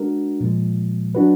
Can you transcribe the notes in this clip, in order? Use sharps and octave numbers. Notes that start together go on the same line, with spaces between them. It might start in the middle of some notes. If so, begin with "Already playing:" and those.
Already playing: G#3 D4 F#4 A#4
A#2 F3 G#3
F#3 D4 F#4 B4